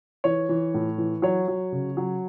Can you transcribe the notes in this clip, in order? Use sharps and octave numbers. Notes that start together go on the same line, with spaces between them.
E3 C#5
E3
A2
E3
F#3 C#5
F#3
C#3
F#3